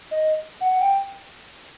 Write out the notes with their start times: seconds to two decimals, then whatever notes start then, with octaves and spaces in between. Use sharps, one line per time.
0.11 D#5
0.61 F#5
0.80 G5